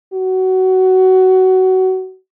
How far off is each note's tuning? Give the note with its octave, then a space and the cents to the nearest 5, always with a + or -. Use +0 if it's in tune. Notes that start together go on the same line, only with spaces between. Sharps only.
F#4 +20